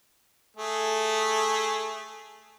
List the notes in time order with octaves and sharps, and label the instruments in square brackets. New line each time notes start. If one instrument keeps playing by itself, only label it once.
[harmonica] A3 G#4